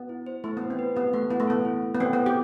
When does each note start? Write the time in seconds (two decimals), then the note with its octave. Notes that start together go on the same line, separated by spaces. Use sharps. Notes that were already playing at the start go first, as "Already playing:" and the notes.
Already playing: B3
0.09 E4
0.27 C5
0.44 A3 E4
0.57 B3
0.61 B4
0.70 C4
0.79 B4
0.96 B3 G4
1.13 A3 F#5
1.30 B3 E4
1.40 A3
1.47 B3 A4
1.65 E4
1.83 A3
1.95 B3
2.00 C4 A4
2.13 B3 E4
2.26 G4